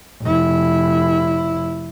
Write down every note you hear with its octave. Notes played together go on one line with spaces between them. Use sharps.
F1 E4